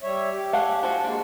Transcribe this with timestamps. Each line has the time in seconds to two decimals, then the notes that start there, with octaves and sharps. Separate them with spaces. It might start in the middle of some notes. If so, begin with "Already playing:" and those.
0.03 G3 C#5 E5
0.32 G4
0.53 A3 F5 F#5 G#5
0.83 F3 F#4
1.04 G#3 A#3 D4 F#4